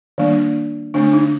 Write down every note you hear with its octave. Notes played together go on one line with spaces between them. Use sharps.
D#3 G3 A#3 D4
D3 A3 C4 D4
D#4